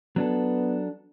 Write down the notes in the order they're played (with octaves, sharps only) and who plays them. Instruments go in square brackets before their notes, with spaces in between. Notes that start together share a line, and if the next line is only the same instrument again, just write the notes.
[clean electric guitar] F#3 D4 A4 [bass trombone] B3